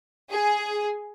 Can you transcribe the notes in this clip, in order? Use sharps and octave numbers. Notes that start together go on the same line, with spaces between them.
G#4